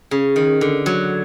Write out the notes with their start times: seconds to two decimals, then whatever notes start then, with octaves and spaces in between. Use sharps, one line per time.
0.11 C#3
0.36 D#3
0.61 D3
0.86 F#3